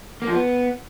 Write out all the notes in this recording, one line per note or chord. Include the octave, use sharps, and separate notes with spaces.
A#3
F3
B3